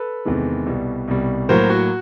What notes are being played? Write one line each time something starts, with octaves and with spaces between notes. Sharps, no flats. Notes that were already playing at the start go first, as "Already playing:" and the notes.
Already playing: A4 B4
E2 C3 D#3 G#3
C2 B2 G3
C2 B2 G3
A2 F#3 A#3 A#4 C5
F#4